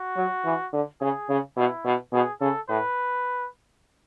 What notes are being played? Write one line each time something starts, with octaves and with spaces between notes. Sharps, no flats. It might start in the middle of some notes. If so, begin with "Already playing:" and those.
Already playing: F#4
F#3
E3
D3
C#3 G#4
C#3
B2 E4
B2
B2 G#4
C#3 A4
A2 B4